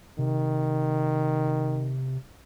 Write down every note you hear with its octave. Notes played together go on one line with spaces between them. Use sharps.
C3 D#3